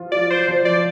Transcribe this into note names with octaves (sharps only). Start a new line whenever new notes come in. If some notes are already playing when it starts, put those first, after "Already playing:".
Already playing: F3 F4
F4 D5
C5
F3
D5